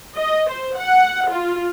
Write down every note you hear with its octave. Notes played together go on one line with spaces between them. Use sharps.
D#5
C5
F#5
F4